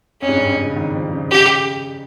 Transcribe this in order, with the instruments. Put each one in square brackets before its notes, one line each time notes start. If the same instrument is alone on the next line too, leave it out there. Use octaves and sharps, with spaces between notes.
[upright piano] F2 [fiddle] C#4
[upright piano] G#2
G2
F2
C#3
D#3
F3
C#3
[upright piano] C#3 [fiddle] G4